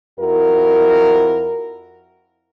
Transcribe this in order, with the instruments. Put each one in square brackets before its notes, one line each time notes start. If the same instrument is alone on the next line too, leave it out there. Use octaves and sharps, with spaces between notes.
[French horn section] F2 E4 F#4 A#4